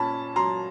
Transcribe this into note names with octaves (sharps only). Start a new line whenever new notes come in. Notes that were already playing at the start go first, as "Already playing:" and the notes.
Already playing: A#2 C#4 A5 B5
F#3 A#5 C6